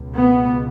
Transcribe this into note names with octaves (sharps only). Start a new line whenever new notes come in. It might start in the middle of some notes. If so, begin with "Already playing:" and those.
Already playing: C#2 B2
B3